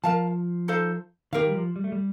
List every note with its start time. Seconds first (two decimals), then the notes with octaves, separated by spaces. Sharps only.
0.04 F3 A#4 F5 A5
0.68 D#4 A4 C5 F5
1.33 D#3 G4 A#4 F5
1.47 G3
1.54 F3
1.76 G3
1.84 A3
1.92 G3